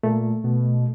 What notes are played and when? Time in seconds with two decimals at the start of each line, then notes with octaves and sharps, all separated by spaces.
0.03 A#2 A3
0.44 B2